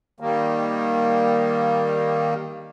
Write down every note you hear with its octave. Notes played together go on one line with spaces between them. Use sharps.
D#3 G3 A#3